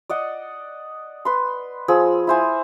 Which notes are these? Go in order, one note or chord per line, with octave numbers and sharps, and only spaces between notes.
D5 D#5 F#5
B4 C6
F3 G#4 E6
E4 C5 G#5